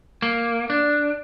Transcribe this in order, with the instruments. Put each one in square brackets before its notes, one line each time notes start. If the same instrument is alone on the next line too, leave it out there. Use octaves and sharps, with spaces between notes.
[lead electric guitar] A#3
D4